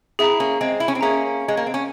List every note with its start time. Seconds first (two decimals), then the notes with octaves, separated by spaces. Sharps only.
0.19 C4 E4 G#4 E5 A#5
0.40 A#3 C#4
0.61 G#3 C4
0.80 E4
0.88 C#4
0.95 C4
1.01 A#3 C#4 G#4 E5 A#5
1.48 G#3
1.57 A#3
1.66 C4
1.74 C#4